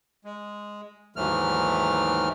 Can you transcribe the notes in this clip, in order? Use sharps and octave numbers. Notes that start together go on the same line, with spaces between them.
G#3
D#2 G#2 E3 F#3 A3 F6